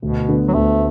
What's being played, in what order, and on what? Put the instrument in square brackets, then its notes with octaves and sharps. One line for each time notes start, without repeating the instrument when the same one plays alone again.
[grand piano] D2 [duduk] B2
[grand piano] D3 B3
[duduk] F#3
[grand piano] D2 [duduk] A3